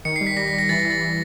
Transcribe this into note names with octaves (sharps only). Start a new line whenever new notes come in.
D#3 C#7
G3 C7
B6
G3 A#6
B6
G3
A#6
E3 A6
A#6
E3
A6
E3